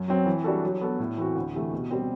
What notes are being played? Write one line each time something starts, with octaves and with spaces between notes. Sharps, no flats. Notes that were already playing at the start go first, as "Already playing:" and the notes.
Already playing: F#2
F#3 C4
E3
G3 D4 F#4 A4
F#3
B3 F#4 A4
A2
E3 A3 C4 F#4
D2
C3 E3 A3
B2
G3 C4